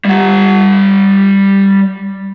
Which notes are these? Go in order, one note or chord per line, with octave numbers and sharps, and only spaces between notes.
G3 F#5